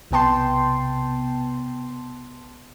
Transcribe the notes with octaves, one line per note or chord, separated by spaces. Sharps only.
B1 C3 B3 G5 A5 C6